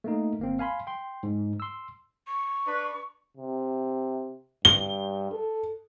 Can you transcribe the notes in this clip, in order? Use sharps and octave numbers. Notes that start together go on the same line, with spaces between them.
A3 A#3 D#4
G1 A#3 C4
F5 G#5 B5 C6
G5 C6
G#2
C6 E6
C#6
D4 B4
C3
G2 G7
A4